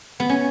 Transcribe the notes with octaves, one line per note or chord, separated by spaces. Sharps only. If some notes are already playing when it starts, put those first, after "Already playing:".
B3
C#4